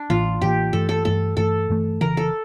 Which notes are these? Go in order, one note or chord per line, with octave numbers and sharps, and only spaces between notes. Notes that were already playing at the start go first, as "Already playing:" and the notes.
Already playing: D4
A1 A2 E3 A#3 F4
A1 A2 E3 A#3 G4
G2 E3 A3 A4
A4
G2 E3 A3 A4
G2 E3 A3 A4
G2 E3 A3
F1 E2 C#3 E3 A#4
A4